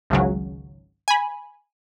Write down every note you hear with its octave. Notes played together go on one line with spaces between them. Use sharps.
G#1 C#2 C#3 F#3
G#5 B5